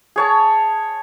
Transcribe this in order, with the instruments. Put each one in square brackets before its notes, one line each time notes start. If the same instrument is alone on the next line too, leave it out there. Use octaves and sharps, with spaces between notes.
[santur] G#4 C#5 A5